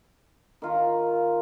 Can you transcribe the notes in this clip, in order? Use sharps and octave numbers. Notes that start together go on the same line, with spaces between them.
D#3 F4 A#5